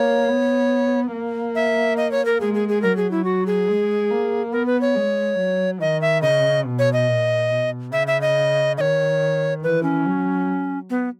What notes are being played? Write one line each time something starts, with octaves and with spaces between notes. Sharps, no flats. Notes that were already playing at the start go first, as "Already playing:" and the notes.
Already playing: A#3 C#5
B3
A#3
E5
D#5
C#5
A#4
G#3 G#4
G#4
G#4
F#3 A#4
G#4
E4
F#4
G#4
G#3
A#3
B3 A#4
B4
C#5
G#3
F#3
D#3 D#5
E5
C#3 D#5
B2
C#5
D#5
A#2
B2
C#3 E5
E5
D#5
D#3 C#5 D#5
E3 B4
C#4
F#3
B3